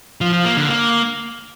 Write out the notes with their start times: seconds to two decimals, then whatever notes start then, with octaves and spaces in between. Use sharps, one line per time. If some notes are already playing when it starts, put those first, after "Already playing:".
0.21 F3
0.33 F3
0.45 A#3
0.57 D3
0.69 A#3